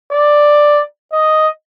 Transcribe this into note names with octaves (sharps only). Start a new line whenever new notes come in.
D5
D#5